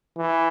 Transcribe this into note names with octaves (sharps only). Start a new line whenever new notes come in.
E3